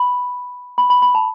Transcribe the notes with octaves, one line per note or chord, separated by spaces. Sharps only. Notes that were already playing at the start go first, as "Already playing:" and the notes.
Already playing: B5
B5
B5
B5
A5